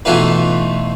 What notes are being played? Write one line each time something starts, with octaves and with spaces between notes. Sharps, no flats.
B2 E3 A3 D#4 F4 B4